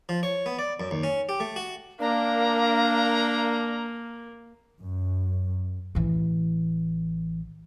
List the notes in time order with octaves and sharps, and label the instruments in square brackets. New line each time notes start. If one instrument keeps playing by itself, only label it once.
[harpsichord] F3
C#5
B3
D5
F#2
D#2
C#4
G4
A3
F#4
[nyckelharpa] A#3 [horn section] D4 [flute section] A#4 F5 [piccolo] A#5
[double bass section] F#2
[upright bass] A1 E3